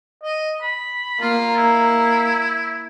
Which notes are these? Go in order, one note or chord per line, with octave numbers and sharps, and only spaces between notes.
D#5
B5
A#3 F4
E4